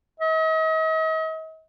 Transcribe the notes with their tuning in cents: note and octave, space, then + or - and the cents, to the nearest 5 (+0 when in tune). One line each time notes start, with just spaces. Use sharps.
D#5 +40